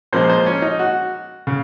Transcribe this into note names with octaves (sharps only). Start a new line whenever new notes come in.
A#2 F3 G#3 C5
C5
C#4
D#4
F#4
C#3